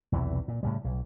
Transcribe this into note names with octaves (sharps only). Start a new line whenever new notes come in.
B1 E2 C3 E3
A#2
A2 C#3 G3
B1